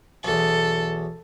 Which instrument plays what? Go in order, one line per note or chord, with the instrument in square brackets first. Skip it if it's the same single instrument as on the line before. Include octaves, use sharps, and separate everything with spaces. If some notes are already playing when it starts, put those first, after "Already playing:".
[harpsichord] B1 E2 [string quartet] A4